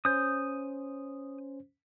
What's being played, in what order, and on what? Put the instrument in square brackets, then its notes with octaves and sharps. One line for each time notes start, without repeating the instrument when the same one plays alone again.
[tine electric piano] C#4 C5 [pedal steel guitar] D#6 G6